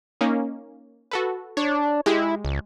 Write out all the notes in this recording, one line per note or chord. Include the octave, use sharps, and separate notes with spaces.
A#3 C#4 D#4
F#4 A4 B4
D4 C#5
G#3 E4 G4
C#2